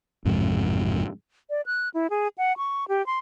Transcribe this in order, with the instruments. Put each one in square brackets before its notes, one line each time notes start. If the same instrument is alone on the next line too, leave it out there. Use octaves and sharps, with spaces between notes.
[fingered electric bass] A1 F2 G#2 C3
[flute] D5
F#6
E4
G#4
F#5
C#6
G4
C6